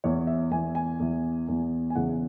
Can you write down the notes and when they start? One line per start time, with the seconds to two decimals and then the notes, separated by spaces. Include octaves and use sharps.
0.04 E2 E3 C#5
0.27 E5
0.51 E2 E3 G#5
0.75 G#5
1.00 E2 E3
1.48 E2 E3
1.90 G#5
1.95 E2 C#3 E3 F#5